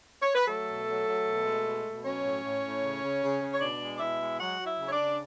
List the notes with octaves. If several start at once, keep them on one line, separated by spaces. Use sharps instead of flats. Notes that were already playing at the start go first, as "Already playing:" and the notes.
C#5
B4
F#3 A3 A4
B2
F#3
F#3
B2
G#3
B2
B2
F#3 C#4 C#5
A2
A2
A2
C#3
C#3
C#3
C#3
C#5
B2 D4 D5
G#3
D5
B2 E4 E5
G#3
F#3 F#4 F#5
F#3
E4 E5
C#3
C#5
D4 D5
C#3